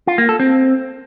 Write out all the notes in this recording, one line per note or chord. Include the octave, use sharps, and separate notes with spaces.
F4
A#3
A4
C4